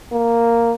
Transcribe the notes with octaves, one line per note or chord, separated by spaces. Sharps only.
A#3